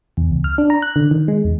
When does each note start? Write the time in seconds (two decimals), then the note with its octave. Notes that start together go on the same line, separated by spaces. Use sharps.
0.17 E2
0.31 C#2
0.44 F6
0.58 D4
0.70 A#5
0.82 F#6
0.96 D3
1.11 D#3
1.28 G#3
1.45 E2